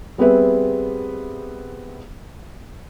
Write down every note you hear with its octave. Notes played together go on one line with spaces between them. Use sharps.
G3 B3 C4 G#4 B4 E5